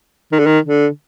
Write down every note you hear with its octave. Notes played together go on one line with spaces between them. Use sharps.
D#3
D3
D#3
D3